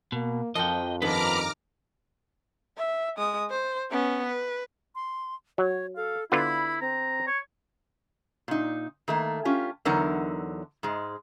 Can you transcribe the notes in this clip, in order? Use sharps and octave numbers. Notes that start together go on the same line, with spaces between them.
B2 A#3
F2 F3 A#3 F#4 D#5 G5
G2 D#3 F3 B3 B4 A#5 D6 F6
E5
G#3 D#6
C5
B3 C#4
B4
C6
F#3 C#5
A4 F5
D3 B3 E4 F4 B5
C4 A#5
C#5
A#2 D#4
D#3 A3 A#3
C#4 F4 G4
E2 D3 F#3 D#4 A#4 F#5
G#2 G#3